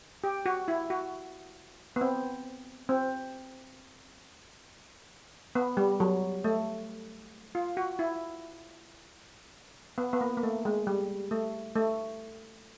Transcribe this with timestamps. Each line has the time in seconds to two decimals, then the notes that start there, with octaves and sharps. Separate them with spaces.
0.24 G4
0.46 F#4
0.68 E4
0.90 F#4
1.96 B3
2.01 C4
2.89 C4
5.55 B3
5.77 G3
6.00 F#3
6.44 A3
7.55 F4
7.77 F#4
7.99 E4
9.98 B3
10.13 B3
10.21 A#3
10.37 A#3
10.43 A3
10.65 G#3
10.87 G3
11.31 A3
11.76 A3